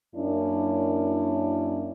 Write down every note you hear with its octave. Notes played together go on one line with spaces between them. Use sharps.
F#2 A#3 C#4 D4 E4